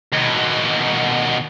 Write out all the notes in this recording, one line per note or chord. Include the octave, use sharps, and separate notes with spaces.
D#2 B2